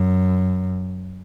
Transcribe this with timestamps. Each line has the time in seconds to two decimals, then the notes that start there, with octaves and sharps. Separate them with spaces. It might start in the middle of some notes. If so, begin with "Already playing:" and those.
Already playing: F#2